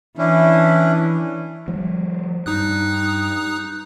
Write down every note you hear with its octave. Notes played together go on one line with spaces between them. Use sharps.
E3 C#4 D4 E4
F3 G3
G2 D#4 D#6 F#6